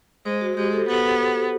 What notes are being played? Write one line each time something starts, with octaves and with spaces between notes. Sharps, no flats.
G#3 C5
F#4
G#3 G4
A4
B3 A4